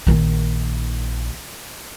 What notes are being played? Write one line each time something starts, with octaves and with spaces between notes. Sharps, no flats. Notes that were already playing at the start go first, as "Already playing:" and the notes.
A#1 D#3